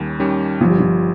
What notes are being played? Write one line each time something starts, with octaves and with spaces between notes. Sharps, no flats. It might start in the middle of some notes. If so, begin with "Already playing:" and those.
Already playing: D#2 D#3 G3 C#4 G4
D#3 G3 C#4 G4
G1 F3
G3
F3